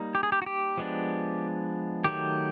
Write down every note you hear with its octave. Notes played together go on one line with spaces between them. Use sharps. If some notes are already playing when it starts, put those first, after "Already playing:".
Already playing: G3 A#3 D#4
G4
G#4
G4
F#4
G4
F3 G#3 B3 D4
D#3 F#3 A3 G4